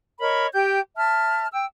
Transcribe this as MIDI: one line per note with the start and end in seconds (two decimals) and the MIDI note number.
0.20 0.47 70
0.20 0.47 73
0.20 0.47 75
0.20 0.47 83
0.53 0.80 67
0.53 0.80 79
0.53 0.80 91
0.97 1.47 76
0.97 1.47 81
0.97 1.47 89
1.52 1.65 79
1.52 1.65 88